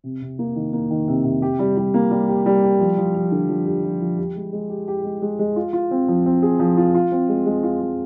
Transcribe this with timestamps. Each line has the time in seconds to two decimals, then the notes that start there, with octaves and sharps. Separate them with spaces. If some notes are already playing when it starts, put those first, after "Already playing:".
0.04 C3
0.21 C3
0.39 A#3
0.56 D#3
0.73 A#3
0.90 D#3
1.08 C3
1.25 C3
1.42 G4
1.59 G3
1.77 G3
1.94 A#3
2.11 G3
2.29 G4
2.46 G3
2.63 G4
2.80 F3
2.98 F3
3.15 F3
3.32 D3
3.49 F3
3.66 G4
3.84 F3
4.01 F3
4.18 G4
4.36 G#3
4.53 G#3
4.70 G4
4.88 G4
5.04 G#3
5.22 G#3
5.39 G#3
5.56 F4
5.73 F4
5.91 C4
6.08 F3
6.26 C4
6.42 G#4
6.60 F3
6.77 F4
6.95 F4
7.12 C4
7.29 G#3
7.46 G#3
7.63 F4
7.81 G#3